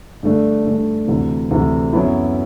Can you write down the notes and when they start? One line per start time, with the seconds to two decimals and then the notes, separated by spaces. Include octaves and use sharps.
0.23 G2 D3 A3 D4
0.66 G2 D3 A3 D4
1.07 D2 C3 E3
1.51 D2 C3 E3
1.93 F#2 F#3 B3 E4